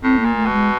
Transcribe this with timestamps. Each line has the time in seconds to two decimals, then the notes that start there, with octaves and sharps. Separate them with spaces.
0.03 A2 C4
0.20 A#3
0.25 A#2
0.36 A3
0.46 B2
0.52 G#3